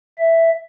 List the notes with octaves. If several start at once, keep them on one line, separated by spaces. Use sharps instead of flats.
E5